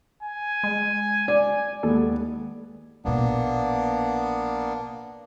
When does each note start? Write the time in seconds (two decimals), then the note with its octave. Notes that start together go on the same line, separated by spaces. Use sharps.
0.23 G#5
0.64 G#3
1.28 D5 G#5
1.83 D#2 G#3 B3 A4
3.05 A#1 B2 A#3 B3 D4